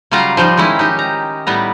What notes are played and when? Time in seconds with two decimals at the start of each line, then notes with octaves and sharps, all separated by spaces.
0.11 C#3 F#3 G3 F4 F5 A#5
0.37 F3 G3 D#4
0.57 D#3 G#3 C#4 E4
0.79 D#4 G4
0.99 A#5
1.47 A2 G3 B3 A#5